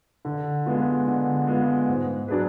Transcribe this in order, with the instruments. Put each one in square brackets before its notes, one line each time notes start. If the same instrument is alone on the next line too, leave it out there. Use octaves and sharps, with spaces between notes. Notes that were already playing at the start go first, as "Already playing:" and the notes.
[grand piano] D3
G#3 B3 F4
D3
G#3 B3 F4
G#2
F#3 D4 G#4 B4